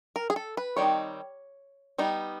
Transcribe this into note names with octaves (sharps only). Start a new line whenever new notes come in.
A#4
G#4
A4
B4
D#3 G3 C4 D#4 C#5
G3 B3 D#4